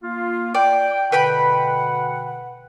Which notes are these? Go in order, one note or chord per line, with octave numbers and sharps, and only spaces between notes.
A#3 F4
D5 G5
B2 D3 B4 F#5 G5 B5